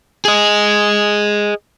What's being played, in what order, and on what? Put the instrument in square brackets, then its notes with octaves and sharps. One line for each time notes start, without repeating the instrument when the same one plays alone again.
[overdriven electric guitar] G#4 D#5